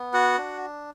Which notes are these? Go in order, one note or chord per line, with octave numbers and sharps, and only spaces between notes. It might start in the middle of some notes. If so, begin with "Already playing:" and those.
Already playing: B3
F#4 F#5
D4